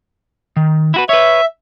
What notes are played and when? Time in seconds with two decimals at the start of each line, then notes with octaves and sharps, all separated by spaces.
0.56 D#3
0.94 E4 F#4 B4
1.09 B4 C#5 E5